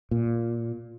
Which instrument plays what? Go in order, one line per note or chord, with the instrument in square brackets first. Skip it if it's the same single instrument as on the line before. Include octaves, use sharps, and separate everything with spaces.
[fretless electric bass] A#2